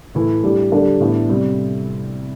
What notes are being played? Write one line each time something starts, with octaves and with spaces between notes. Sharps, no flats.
A2 E3 A3 E4
A2 G3 D4 G4
D3 G3 D4 G4
A2 E3 B3 D4
C3 G3 C4